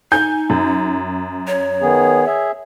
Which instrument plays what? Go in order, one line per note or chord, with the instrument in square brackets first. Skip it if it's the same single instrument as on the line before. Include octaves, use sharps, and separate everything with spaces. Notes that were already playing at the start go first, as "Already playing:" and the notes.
[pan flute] D#4 [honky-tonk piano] G#5 G6
[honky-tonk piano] F#2
[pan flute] C#5
[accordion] D#3 B3 G#4
G#4 E5